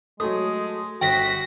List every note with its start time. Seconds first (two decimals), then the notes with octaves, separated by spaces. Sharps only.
0.20 F#3 G#3 A3 D#6
1.01 G1 F#4 G5 A#6 B6